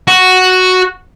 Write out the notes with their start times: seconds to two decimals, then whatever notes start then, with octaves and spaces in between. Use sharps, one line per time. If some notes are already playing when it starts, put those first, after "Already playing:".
0.08 F#4